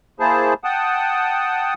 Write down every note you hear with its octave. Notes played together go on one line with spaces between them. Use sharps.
A#3 E4 G#4 C5 A5
F#5 G5 A5 D#6